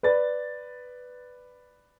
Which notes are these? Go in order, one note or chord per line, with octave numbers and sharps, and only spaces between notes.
B4 D5 A6